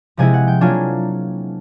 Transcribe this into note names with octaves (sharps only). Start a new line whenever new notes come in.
C3 F3 G#3 C4 E4 G#5
F#5
G5
F#3 A#3 D4 F4 G#5